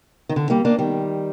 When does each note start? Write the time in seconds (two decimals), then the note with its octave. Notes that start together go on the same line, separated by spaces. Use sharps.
0.29 D#3
0.36 D3
0.50 G3 A#3
0.65 A#3 D4
0.79 D#3 G3